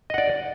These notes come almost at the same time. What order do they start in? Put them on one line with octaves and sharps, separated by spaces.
D#5 F#5 D5